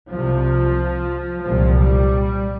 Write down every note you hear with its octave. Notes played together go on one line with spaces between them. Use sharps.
C2 C3 F3
C2 A#2 F3
G3